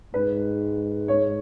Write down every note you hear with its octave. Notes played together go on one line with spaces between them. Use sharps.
G#2 B4
C#5